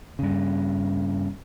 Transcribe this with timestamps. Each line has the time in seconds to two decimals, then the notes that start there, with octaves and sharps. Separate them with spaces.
0.19 G2 C#3